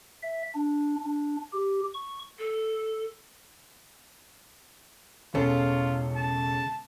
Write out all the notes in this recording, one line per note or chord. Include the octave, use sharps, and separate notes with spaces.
E5
D4
D4
G4
C#6
A4
E1 C#3 C#4 F4 A4
A5